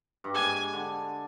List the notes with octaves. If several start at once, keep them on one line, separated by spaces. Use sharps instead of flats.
G2
G#2 G#5
D3